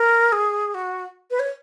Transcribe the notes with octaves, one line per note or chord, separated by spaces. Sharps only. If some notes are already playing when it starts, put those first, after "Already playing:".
Already playing: A#4
G#4
F#4
B4
C#5